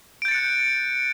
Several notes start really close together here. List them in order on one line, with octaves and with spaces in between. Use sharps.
D7 G6 A6 C#7 F#6